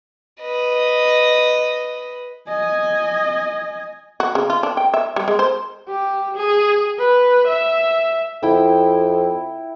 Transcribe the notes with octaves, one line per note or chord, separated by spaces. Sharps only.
B4 D#5
D#5 G#5
F#4
C#3
F4
D4
G5
E5
G3
G#3
C5
G4
G#4
B4
E5
F2 E4 G5